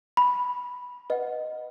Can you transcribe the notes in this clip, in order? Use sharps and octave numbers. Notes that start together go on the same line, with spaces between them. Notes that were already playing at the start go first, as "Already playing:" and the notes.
B5
B4 D#5 F#5